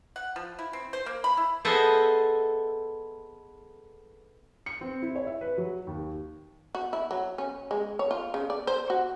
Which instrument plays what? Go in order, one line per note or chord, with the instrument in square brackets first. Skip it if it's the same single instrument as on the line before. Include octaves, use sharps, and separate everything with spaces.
[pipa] F#5
F3
E4
C4
C5
A#3
B5
E4
[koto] B3 G#4 A4 C5 D#5 E5
[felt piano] C#7
C4
E4
C#5
E5
B4
F#3
D#2
[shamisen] F#4
E4
F#3
C#4
G#3
C#5
F4
C#3
D5
C5
F#4